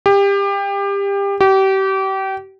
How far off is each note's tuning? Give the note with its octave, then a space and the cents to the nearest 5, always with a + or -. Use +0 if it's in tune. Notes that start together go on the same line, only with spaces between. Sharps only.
G4 +25
G4 -30